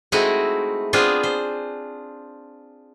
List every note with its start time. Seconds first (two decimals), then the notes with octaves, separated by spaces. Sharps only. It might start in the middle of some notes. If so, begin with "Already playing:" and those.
0.12 G#3 A3 C4 D#4 E4 F#4
0.93 B3 C4 D4 F4 G#4 C5
1.23 C5